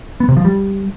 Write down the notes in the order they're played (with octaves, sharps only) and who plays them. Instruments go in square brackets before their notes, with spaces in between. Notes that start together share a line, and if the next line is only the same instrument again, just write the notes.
[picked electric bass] B3
C3
F3
G3